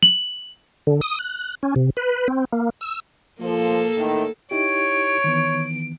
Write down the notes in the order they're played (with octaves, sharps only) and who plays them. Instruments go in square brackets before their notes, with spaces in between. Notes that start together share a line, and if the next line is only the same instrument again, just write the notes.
[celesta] F#7
[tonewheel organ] D3
D#6
F#6
C#4
C3
B4
C4
A#3
E6
[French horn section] F3 [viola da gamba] A#3 A4
[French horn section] A2 D#3
[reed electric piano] D#4 E4 G4 [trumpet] C#5 [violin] D7
[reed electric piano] D#3 E3 B3